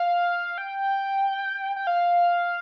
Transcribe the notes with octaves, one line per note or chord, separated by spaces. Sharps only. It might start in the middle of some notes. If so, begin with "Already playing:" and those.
Already playing: F5
G5
G5
F5